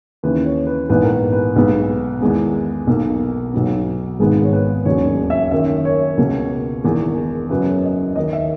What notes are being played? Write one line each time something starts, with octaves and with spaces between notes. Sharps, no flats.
D#2 C#3 E3 B4
C#5
B4
A#1 G#2 E3 B3 B4
A#4
B4
B4
B1 B2 G#3 B3
E2 D#3 G#3 B3
B1 B2 A#3
B1 B2 F#3 B3
G#1 G#2 D#3 G#3 B3 G#4
C#5
B4
E1 D#2 C#3 F#3 C#5
E5
F#2 D#3 A#3 E5
C#5
C#2 B2 A#3
E1 E2 D#3 A#3
F#2 C#3 F#3 B4
D#5
D#2 D#3 A#3 D#5
E5